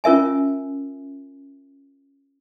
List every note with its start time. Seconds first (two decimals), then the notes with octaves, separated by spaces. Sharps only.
0.04 C#4 F4 A#4 E5 G#5